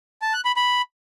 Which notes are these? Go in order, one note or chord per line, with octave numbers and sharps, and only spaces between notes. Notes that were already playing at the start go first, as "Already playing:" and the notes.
A5
F#6
B5
B5